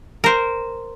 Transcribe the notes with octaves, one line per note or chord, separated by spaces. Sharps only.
A#4 C5